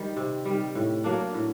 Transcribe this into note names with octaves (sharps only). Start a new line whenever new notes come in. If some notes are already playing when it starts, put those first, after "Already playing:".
Already playing: D#3 G3
C3
D#3 G3
A2
F#3 A#3 D4
A2